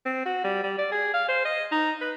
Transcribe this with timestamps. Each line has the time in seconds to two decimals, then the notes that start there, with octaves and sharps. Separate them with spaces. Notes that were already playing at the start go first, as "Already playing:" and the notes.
0.06 C4
0.26 F#4
0.44 G3
0.63 G3
0.79 D5
0.92 G#4
1.14 F5
1.29 C5
1.45 D#5
1.72 D#4
2.01 B4